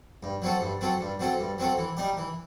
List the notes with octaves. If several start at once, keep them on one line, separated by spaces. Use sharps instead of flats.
G2
F#3 C4 F#4 A4
G2
F#3 C4 F#4 A4
G2
F#3 C4 F#4 A4
G2
F#3 C4 F#4 A4
E3
G3 D#4 G4
E3